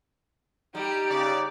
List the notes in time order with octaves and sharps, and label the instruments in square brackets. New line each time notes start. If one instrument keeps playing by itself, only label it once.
[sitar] G3 [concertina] D#4 [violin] G4
[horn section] C#3 D5